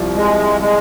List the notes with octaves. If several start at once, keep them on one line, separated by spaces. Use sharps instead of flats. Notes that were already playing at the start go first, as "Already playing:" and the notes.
Already playing: C2 F3
G#3
G#3